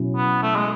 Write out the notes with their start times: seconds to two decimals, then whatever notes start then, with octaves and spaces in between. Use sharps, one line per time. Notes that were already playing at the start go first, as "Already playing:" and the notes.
Already playing: B2 F#3 C#4 E4
0.16 B3
0.42 A3
0.56 G#3